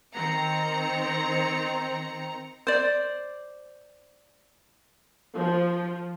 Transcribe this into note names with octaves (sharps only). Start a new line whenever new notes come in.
D#3 C4 A#5 C#7
C5 D5
F3